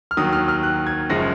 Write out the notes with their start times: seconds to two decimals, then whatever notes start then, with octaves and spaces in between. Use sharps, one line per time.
0.11 F6
0.17 D#2 D#3 F#3 D#6
0.33 F6
0.48 F6
0.63 F#6
0.87 G#6
1.09 F#1 F#2 F3 G#3 A#6